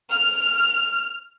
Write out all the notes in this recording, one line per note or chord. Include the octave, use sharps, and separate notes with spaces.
F6